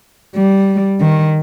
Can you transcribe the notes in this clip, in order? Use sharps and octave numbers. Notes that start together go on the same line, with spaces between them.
G3
D#3